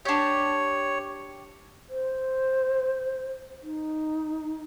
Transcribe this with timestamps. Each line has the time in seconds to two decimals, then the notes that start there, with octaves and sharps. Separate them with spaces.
0.05 D4 G4 C#5
1.89 C5
3.63 D#4